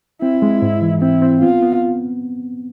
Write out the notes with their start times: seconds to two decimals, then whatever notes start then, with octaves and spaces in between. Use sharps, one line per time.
0.22 C4 E4
0.42 G#3
0.62 G#2
0.82 E3
1.02 C4 E4
1.22 C4
1.41 B3 F4
1.62 B3